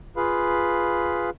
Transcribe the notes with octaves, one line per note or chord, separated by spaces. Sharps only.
F4 G#4 B4 F5 B5